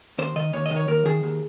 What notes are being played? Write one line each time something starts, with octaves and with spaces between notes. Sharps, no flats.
D#2 C5
D#3 D#5
D#2 C#5
D#5
D#3
C#5
D#2 A#4
D#3 G#4
D#2